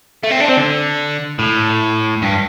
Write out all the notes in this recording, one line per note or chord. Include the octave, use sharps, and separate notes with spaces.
A3
C4
D4
C4
D3
A2
G2